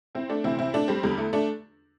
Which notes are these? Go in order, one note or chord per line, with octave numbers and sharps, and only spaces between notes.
C4 E4
A3 D4
D2 C3 E3 C4 E4
C4 E4
A3 D4
G3 C4
E2 D3 G3
A3
A3 D4